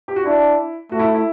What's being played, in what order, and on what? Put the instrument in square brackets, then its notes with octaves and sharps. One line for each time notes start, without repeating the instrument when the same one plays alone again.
[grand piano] G4
F#4
[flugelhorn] D4 [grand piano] E4
[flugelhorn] A3 [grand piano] F#4
[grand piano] E4
E4